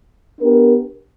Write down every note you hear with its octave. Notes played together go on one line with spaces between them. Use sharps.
B3 D4 G4 A#4